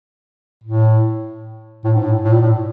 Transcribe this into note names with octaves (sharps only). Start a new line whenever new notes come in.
A2
A2
G#2
A2
A2
A#2
A2